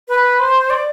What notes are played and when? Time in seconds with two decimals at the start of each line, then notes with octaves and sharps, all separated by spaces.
0.09 B4
0.40 C5
0.70 D5